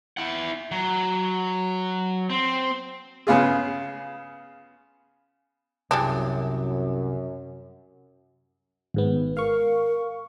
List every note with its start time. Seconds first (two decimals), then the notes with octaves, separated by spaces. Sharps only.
0.17 E4 F#5
0.71 F#3
2.30 C4
3.27 C#3 B3 F4 G#4
5.91 C2 F#2 G3 G#3 D4
8.94 G#1 G#2 B3
9.37 A#4 F5 C#6